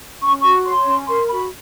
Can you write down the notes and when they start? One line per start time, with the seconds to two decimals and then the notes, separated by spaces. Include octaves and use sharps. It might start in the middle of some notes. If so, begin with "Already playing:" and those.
0.22 C#4 C#6
0.41 F#4 C#6
0.65 C#5 C6
0.85 C#4
1.07 A#4 C6
1.28 F#4 B5